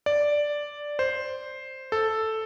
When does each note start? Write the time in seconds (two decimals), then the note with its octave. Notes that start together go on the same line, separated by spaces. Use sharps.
0.06 D5
0.99 C5
1.92 A4